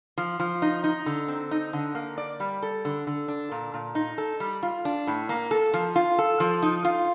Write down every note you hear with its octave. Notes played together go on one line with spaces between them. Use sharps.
F3
F3
D#4
D#4
D3
C4
D#4
D3
A#3
D5
G3
A4
D3
D3
D4
A#2
A#2
D#4
A4
G3
F4
D4
A2
A#3
A4
F3
F4
A4
F3
D#4
F4